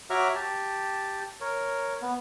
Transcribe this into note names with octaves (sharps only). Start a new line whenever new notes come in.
F#4 C#5 E5 A#5 D6 F6
G4 A5
A#4 C#5
B3